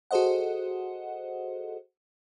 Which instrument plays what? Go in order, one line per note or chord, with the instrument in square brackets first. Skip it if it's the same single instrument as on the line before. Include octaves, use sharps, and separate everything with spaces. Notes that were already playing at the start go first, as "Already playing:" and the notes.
[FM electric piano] F#4 G#4 A4 C5 D#5 F#5